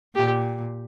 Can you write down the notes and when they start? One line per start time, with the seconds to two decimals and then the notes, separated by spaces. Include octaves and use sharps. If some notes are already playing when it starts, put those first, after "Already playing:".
0.16 A#2 G4